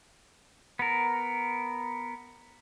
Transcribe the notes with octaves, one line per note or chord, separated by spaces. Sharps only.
B3 A#4